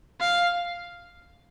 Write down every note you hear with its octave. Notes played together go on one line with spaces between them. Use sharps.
F5